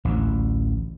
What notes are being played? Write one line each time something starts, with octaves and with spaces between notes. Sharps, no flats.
A1 D2